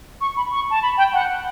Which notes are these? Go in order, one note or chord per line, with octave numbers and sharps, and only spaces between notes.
C#6
B5
C#6
A5
B5
G5
F#5